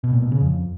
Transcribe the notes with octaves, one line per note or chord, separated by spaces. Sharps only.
B2
A#2
B2
C#3
F2